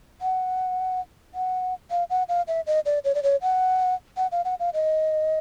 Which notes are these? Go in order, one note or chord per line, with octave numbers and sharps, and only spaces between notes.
F#5
F#5
F5
F#5
F5
E5
D#5
D5
C#5
D5
C#5
F#5
F#5
F5
F#5
F5
D#5